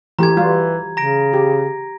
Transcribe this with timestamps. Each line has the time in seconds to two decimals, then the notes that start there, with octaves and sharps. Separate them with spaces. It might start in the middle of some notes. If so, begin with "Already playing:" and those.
0.19 E3 A3 G4 A#5 G#6
0.37 E3 G3 F4 F#4
0.97 C#3 A#5 A#6 D7
1.33 G4